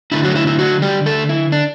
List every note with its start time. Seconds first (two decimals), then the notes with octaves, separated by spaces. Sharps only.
0.12 D3 A3 D4 E4
0.24 F#3 F#4
0.35 E4
0.47 E4
0.59 F#3 F#4
0.82 G3 G4
1.06 A3 A4
1.29 E4
1.52 D4